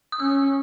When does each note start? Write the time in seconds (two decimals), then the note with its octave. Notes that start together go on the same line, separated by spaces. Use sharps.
0.12 D#6
0.20 C#4 E6